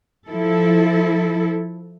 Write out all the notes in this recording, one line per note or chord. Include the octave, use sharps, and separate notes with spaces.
F3 E4 A4